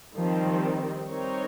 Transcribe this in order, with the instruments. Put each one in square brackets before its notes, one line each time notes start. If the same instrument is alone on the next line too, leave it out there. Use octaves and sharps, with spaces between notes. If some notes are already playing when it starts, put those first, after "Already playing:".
[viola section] D#3 G3 C4 [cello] F3
[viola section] G3 C4 D#4 A#4 C#5